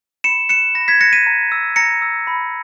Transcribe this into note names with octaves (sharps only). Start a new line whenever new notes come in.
B5 C#7 E7
F#6 C#7 E7
B5 A#6
G#6 B6
F#6 A#6 C#7
B6 D#7
A#5
E6
A#5 A#6 C#7
E6
B5